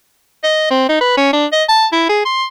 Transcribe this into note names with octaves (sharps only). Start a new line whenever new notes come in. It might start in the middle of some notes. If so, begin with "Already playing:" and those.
D#5
C4
D#4
B4
C#4
D4
D#5
A5
E4
G#4
C6